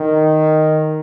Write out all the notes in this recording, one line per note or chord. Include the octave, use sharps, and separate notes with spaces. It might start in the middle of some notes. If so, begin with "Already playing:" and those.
Already playing: D#3